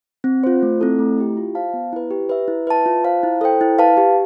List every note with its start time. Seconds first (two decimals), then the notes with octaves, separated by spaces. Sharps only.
0.24 C4
0.44 F4 C5
0.62 A3
0.81 C4 E4 A4
0.99 A3
1.18 E4 G4
1.37 F4
1.55 C5 F5 A5
1.74 B3
1.93 E4 B4
2.11 G4
2.29 B4 E5
2.48 E4
2.67 B4 E5 A5
2.86 F4
3.04 C5 F5 A5
3.23 E4
3.41 A4 C5 G5
3.61 E4
3.79 B4 F5 A5
3.97 G4